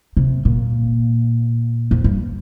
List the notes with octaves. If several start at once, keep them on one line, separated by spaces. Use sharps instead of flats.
C3
A#2
F2
G2